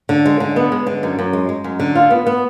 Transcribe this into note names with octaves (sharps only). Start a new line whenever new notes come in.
D3
G#3
D3
B3
G#3
D3
F#2
F#2
G#3
G#3
F#2
D3
F4
B3
B3